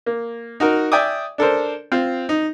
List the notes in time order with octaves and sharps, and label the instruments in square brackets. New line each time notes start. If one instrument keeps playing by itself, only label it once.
[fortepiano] A#3
D#4 F#4 A#4
D5 E5 G5 G#5 D6 D#6
D4 A4 A#4 C5
C4 F4
D#4